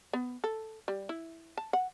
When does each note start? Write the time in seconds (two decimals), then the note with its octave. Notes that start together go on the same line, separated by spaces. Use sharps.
0.13 B3
0.44 A4
0.88 G3
1.09 E4
1.57 A5
1.73 F#5